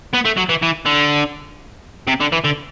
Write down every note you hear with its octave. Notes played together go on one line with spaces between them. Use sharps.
B3
A3
F#3
E3
E3
D3
C3
D3
E3
D3